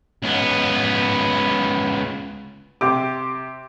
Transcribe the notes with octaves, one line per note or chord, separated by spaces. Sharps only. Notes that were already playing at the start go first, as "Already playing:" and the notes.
C#2 B3
C3 G4 D6